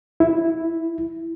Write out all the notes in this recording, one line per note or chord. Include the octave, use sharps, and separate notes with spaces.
E4